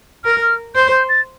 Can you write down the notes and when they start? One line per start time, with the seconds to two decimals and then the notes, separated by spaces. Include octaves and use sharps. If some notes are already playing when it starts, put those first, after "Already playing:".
0.24 A#4 F6
0.42 F6
0.75 C5 G6
0.91 G6
1.09 A6